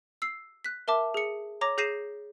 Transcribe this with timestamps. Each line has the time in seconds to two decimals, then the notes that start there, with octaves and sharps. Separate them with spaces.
0.22 E6 C7
0.64 F#6 B6
0.88 A#4 E5 A5 D6
1.14 G#4 C#7
1.61 C#5 A#5 D6 A#6
1.78 G#4 G6 A#6 C7 D#7 E7